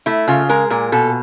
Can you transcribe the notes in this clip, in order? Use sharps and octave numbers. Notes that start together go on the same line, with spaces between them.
A3 E4
C#3 F4
G#3 A#4
A#2 A#4
B2 A4